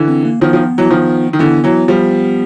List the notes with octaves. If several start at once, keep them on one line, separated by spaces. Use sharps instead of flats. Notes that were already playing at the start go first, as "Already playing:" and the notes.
Already playing: D3 E3
C4
A#3
D#3 F3 B3
D#3 F3
E3 F#3
D#3 F3
D#3
D3 E3 B3
E3 F#3
F3 G3